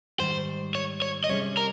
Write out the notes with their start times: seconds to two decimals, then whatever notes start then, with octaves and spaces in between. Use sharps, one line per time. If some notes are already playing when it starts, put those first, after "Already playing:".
0.19 G#2 D#3 G3 C5
0.75 C#5
1.02 C#5
1.24 D#5
1.29 C3 G3 C#4 G#4 C5 C#5
1.57 A#4